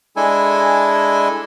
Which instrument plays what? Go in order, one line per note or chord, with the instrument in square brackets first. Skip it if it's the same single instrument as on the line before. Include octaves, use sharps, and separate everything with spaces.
[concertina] G#3 D4 E4 A4 G#5